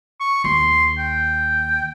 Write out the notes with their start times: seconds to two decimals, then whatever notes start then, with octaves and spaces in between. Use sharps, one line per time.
0.20 C#6
0.44 D#2 C6
0.98 G5